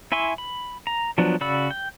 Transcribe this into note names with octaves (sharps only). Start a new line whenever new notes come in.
E4 E5 G#5 C6 C#6
B5
A#5
F3 F#3 B3 D4
C#3 F#4 D5 B5 E6
G5